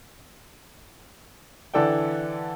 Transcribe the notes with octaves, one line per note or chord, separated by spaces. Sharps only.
D3 E3 A4 D5 G5